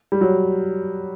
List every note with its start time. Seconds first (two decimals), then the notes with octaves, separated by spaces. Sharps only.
0.12 G3
0.21 F#3